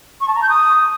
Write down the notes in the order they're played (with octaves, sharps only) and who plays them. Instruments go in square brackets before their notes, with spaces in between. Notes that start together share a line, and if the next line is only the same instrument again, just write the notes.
[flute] C#6
A5
A#5
G6
D#6